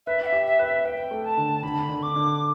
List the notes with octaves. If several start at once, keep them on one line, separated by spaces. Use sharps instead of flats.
B4 E5
G5
E5
G4
E5
B4
E5
B4 G5
A3
A5
D3
D3 B5
D3
D6
D3